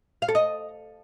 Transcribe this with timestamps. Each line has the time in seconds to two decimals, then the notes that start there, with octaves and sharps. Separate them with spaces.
0.22 F5
0.28 A4
0.35 D#5